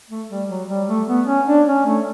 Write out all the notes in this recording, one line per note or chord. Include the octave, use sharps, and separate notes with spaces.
A3
G3
F#3
G3
A3
B3
C#4
D4
C#4
A3